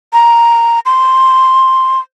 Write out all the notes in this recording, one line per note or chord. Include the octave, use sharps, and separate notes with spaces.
A#5
C6